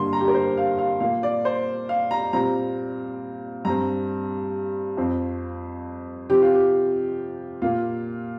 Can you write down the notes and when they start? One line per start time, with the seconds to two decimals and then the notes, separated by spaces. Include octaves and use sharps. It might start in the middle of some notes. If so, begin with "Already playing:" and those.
Already playing: G2 D3 G3 A#3 C6
0.13 A#5
0.21 G4
0.28 A#4
0.34 C5
0.57 F5
0.78 F5
1.00 A#2 A#3 F5
1.23 D5
1.45 C5
1.89 F5
2.11 A#5
2.33 A#2 G3 C4 A#5
3.65 G2 G3 C4 A#5
4.97 F2 F3 C4
6.29 C3 F3 C4 G4
6.42 F4
6.55 G4
7.62 A#2 A#3 F4